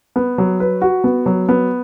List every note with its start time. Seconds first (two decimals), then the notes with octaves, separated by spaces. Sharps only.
0.16 B3
0.38 F#3
0.60 B4
0.82 F#4
1.04 B3
1.26 F#3
1.49 B3